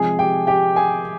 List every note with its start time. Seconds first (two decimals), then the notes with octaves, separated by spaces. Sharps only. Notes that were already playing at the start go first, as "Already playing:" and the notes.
Already playing: C3 F3 G#3 G#4 G#5
0.19 G4 G5
0.47 G4 G5
0.76 G#4 G#5